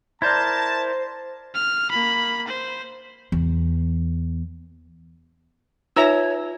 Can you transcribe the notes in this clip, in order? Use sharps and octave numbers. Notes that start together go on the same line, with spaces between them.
E4 A#4 C5 D5 A5 G6 G#6
F6
A#3 B5
C5
E2
D#4 F4 B4 C#5 E5 A#5 E6